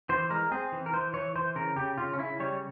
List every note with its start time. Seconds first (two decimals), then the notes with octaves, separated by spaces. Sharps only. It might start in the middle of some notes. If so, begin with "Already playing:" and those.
0.09 E3 C5
0.30 G#3 A#4
0.51 C4 G#4
0.72 E3
0.86 A#4
0.93 E3 C5
1.14 E3 C#5
1.35 E3 C5
1.56 C#3 A#4
1.76 C#3 G4
1.98 C#3 F4
2.13 C#4
2.19 C#3 E4
2.40 G3 C#5